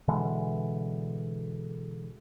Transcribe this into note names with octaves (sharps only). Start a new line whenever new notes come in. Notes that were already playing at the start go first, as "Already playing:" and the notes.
B2 D3 E3 G#3